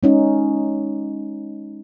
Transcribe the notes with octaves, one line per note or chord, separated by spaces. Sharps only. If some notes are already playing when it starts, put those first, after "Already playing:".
G#3 C#4 D#4